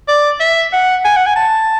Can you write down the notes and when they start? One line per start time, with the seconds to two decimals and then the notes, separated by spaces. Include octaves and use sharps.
0.08 D5
0.40 E5
0.73 F#5
1.05 G#5
1.16 F#5
1.26 G#5
1.36 A5